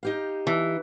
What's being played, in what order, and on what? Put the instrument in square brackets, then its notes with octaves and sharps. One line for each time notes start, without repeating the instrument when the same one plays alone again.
[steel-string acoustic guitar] D#4 G4 F5
[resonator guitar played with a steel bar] E3